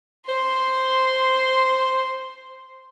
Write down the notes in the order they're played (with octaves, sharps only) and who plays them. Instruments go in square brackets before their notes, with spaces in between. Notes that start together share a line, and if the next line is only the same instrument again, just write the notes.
[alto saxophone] C5 [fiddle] C6